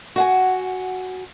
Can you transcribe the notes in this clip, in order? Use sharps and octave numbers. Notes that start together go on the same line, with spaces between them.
F#4 F#5 G#5